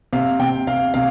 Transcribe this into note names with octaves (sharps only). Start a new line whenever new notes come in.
C3 F5
C3 G5
C3 F5
C3 F5